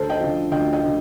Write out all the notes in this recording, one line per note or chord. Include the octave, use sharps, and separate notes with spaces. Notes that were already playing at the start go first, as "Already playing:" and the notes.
Already playing: D2 A4 C5
D#5 G5
D3 F3
D2 D#5 G5
D#5 G5
D3 F3